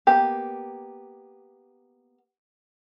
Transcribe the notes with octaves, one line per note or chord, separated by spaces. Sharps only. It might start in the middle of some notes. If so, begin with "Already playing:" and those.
A#3 B3 G4